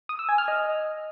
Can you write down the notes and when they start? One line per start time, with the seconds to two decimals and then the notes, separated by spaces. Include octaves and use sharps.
0.09 D#6
0.19 E6
0.29 G#5
0.38 F6
0.48 D#5